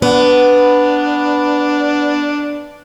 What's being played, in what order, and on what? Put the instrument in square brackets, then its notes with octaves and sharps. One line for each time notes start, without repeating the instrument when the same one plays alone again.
[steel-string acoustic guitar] B3 [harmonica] D4